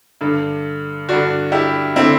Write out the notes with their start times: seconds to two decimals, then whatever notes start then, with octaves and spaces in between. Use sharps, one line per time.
0.21 G2 D3
1.09 G2 D3 D4 F#4
1.52 E4 G4
1.96 D3 C4 E4